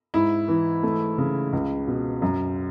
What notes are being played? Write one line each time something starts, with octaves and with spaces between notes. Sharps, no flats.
G#2 E4
E3
A3
C#3
C#2
B2
F#2